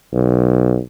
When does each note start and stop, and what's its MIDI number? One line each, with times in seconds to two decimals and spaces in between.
0.13 0.78 35